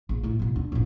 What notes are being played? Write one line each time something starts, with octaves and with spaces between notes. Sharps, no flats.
A#1
A2 A3
B2 A#3
D4
A1 A#2